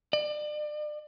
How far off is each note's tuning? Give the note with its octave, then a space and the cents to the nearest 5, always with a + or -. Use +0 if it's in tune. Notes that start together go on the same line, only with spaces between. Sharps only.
D5 +35